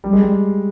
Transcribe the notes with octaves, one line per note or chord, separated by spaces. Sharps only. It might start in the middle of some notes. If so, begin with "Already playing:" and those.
G3
G#3
G3